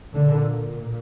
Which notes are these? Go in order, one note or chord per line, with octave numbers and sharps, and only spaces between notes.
A#2 D3